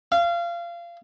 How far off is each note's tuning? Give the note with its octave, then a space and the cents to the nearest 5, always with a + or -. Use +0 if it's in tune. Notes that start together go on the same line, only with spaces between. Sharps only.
F5 -25